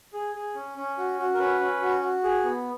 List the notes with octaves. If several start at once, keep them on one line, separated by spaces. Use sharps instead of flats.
G#4
G#4
C#4
C#4
F#4
F#4
A#4
C#4 B4
C#4
F#4
F#4
G#4
B3